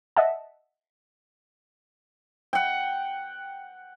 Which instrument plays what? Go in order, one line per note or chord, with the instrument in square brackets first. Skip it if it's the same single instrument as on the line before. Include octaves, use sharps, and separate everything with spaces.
[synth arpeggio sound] D#5 E5 F#5 A5
[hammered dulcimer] F#5 G5